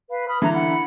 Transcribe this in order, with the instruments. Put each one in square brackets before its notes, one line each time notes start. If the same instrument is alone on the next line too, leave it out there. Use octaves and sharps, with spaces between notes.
[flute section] B4 F5 B5
B5 D#6 F6
[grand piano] D3 E3 [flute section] A#5
[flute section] F#5 B5